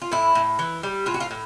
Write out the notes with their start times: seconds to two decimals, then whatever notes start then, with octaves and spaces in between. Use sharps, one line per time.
0.02 F4
0.11 A2 E4
0.35 A2
0.59 E3
0.83 G3
1.06 A2 F4
1.14 F#4
1.20 F4
1.31 A2